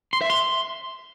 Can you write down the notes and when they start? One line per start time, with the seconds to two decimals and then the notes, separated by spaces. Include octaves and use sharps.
0.13 C6
0.21 E5
0.30 C6